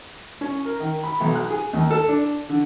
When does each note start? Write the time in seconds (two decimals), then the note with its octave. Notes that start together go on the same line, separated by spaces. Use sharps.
0.41 C#4
0.65 A#4
0.80 D#3
1.04 B5
1.21 B1
1.35 F#6
1.50 G#4
1.73 D#2
1.90 A4
2.08 D4
2.49 D3